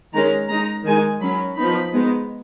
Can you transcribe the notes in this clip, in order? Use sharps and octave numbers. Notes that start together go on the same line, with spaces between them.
D#3 G#3 C#4 A#5
G#3 D#4 A#5
D#3 G#3 D#4 G#5
F#3 C#4 B5
F3 B3 D#4 B5
G#3 B3 D#4